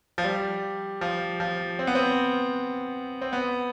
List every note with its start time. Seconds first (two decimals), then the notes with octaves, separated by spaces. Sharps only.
0.18 F3
0.24 G3
1.01 F3
1.40 F3
1.79 C4
1.87 B3
1.95 C4
3.22 C4
3.33 B3